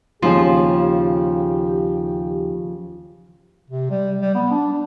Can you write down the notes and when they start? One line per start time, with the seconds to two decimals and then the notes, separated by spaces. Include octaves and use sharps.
0.22 D#2 C#3 F3 G4 G#4
3.70 C3
3.91 G3
4.21 G3
4.35 B3
4.51 D4
4.72 D4